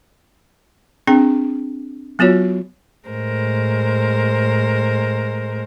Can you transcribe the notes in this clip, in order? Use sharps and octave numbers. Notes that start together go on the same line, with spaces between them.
C4 D4 G#4 G5
F#3 B3 F4 F#4 C#5
A2 G#3 A#4 C5